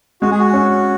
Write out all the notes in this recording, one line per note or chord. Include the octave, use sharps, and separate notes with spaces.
G#3 F#4
G#4
F#4
C#4